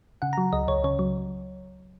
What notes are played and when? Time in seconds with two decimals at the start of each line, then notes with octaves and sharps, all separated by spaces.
0.22 C#3 F#5
0.33 A#5
0.38 F#3
0.53 C#2 D#5
0.68 C#2 C#5
0.84 C#3 C#5
0.99 F#3